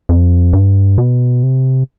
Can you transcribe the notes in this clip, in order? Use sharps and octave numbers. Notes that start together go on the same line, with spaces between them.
F2
G2
B2
C3